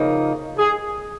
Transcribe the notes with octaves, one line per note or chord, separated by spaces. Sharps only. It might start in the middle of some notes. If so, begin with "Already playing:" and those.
Already playing: C#3 F3 A#3 D#4
G#4